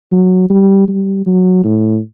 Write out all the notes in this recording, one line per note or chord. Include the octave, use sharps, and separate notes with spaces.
F#3
G3
G3
F#3
A2